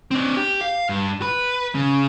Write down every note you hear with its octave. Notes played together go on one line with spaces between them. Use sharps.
C4 D4
G4
F5
G2
B4
C#3